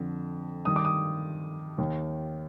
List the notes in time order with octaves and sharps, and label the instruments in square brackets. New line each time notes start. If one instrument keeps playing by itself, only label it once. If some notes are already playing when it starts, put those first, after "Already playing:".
Already playing: [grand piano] F2 D3
G2 D#3 D#6
D6
D#6
D#2 D#3